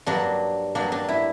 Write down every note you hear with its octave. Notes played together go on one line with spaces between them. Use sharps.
G2 F#3 A#3 D4
G2 F#3 A#3 D4
D4
E4